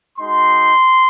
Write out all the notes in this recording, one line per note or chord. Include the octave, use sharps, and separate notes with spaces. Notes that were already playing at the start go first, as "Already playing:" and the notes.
G#3 D#4 F#4 C6